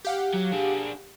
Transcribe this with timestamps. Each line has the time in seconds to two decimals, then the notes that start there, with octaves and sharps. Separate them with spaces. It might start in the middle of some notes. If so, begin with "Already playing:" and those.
0.05 G4 F5 F#5
0.33 F#3
0.52 D4 G#4